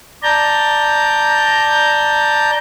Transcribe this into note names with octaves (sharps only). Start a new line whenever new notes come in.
D5 A5 A#5 G6